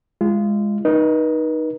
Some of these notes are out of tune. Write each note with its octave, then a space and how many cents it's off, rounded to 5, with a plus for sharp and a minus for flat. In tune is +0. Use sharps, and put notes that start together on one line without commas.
G#3 -10 F4 -25
D#4 -5 B4 -40